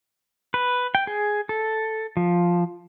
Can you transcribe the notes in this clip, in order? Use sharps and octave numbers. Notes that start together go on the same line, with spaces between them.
B4
G5
G#4
A4
F3